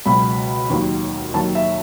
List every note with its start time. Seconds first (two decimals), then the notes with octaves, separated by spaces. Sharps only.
0.06 C#2 B2 F#3 B5
0.70 D#2 D#3 F#3
1.34 D#2 D#3 F#3 A5
1.55 E5